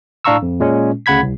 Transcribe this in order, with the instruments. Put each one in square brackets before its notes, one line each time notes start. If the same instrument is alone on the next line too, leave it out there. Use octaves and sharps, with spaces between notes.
[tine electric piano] A2 D4 F5 A#5 C#6 E6
F2
A#2 G#3 C#4
D2 C#3 F#5 B5 G#6 B6
C2